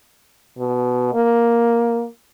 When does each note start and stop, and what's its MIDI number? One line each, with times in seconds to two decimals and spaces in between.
0.58 1.12 47
1.14 2.06 58